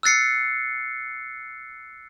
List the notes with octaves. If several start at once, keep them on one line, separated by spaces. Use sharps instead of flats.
E6 F#6 A6 C7 C#7